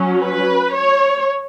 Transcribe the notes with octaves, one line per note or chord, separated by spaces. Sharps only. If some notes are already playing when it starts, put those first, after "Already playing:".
Already playing: F#3 C#4
B4
C#5